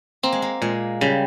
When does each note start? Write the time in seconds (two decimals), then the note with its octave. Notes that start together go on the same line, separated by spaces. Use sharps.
0.23 A#3 C4
0.32 G#3
0.42 A#3
0.62 A#2 G#3
1.01 C#3 G3